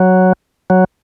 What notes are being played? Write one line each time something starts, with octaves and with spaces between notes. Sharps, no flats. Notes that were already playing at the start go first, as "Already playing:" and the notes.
Already playing: F#3
F#3